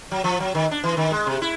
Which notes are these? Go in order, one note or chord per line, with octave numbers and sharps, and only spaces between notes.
F#3
F3
F#3
D#3
D4
E3
D#3
G#3
C3
E4